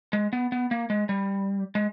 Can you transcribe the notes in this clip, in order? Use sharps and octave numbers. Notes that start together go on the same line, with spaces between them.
G#3
B3
B3
A#3
G#3
G3
G#3